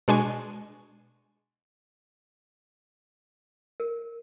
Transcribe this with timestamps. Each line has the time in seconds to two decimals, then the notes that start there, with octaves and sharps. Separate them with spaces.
0.08 B2 G#3 D4 G#5 C#6
3.80 A#4